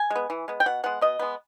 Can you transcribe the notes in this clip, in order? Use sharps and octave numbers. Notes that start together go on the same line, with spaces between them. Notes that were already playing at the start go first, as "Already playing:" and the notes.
Already playing: G#5
G#3
B3
E3
G#3 B3
G5
B2 F#5
G#3 B3 F#5
B2 D#5
G#3 B3